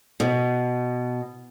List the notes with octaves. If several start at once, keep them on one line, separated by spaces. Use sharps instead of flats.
B2